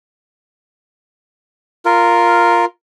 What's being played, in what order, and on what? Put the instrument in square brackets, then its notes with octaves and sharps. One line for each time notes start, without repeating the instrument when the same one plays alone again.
[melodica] F4 A#4